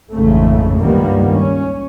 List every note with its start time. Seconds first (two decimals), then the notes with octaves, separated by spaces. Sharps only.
0.11 A1 F2 G#2 C#3 A3
0.79 C#2 G2 D#3 G3 A#3 B3
1.30 C#4